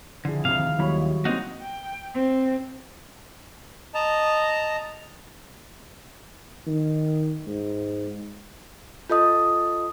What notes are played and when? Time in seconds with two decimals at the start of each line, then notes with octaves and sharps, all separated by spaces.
0.25 D3 F3 E4 G#4
0.45 D2 C3 G#3 F5
0.59 D#3 D#5
0.79 D#2 F#3 G3 E4 C#5 B5
1.25 A#3 C4 D#4 F#4
1.62 G5
2.14 C4
3.94 D#5 A5 A#5
6.67 D#3
7.47 G#2
9.10 F4 A4 D#5 D#6